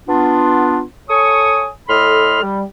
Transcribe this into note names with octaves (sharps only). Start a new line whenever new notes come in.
B3 D4 F4
A4 C#5 G#5 C#6 D#6
A2 A4 D#5 B5 C6 F6
G3